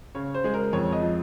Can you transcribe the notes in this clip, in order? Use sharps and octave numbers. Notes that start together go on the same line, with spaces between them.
C#3 C#5
C5
G#3 G#4
A#4
F2 C#5
D#5
F3